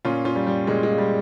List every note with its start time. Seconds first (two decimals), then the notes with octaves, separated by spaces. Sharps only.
0.05 A#2 C#4 F4
0.25 C#4 F4
0.36 G3
0.47 G3
0.67 A#2 G#3
0.83 G#3
0.98 G3